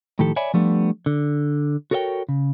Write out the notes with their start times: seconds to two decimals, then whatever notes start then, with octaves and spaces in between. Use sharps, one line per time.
0.19 A2 D#3 F3 G4 A4
0.36 C#5 D5 E5 G#5 B5
0.54 F3 G3 A3 B3 D4
1.06 D3
1.91 F#4 A4 A#4 C#5 E5 G5
2.29 C#3